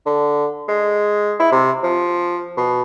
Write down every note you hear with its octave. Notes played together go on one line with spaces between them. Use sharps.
D3
G#3
E4
C3
F3
B2